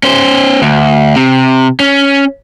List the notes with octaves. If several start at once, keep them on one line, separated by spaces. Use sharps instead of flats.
C#4 C5
D2
C3
C#4